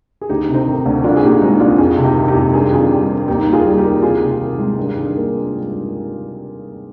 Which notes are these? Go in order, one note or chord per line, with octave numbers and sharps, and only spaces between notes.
G#4
D2 D#4 G4
C3
C4 D#4
D#3
D2
C2 D4 F4
G#4
A#2 D#4 G4
G#3 C4 D#4
C2 D4 F4
F2 F4 G#4
C3
D#4 G4
D#3
D#4 G4
F2
G2 G#4
D#3 F4 G#4
G3
C4
D#2 D#4 G4
D#3
F4 G#4
G3
D#4 G4
A#3
C2 F4 G#4
C3
D#3
G#3
G2
D#3
A#3